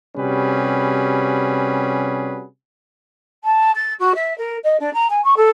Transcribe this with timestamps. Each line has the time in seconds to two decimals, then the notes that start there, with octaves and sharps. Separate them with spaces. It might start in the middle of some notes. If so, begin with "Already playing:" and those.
0.16 C3 G3 C#4 F#4 G#4 B4
3.44 A5
3.75 A6
3.99 F#4
4.14 E5
4.37 A#4
4.63 D#5
4.79 D4
4.93 A#5
5.10 G#5
5.24 C#6
5.36 A4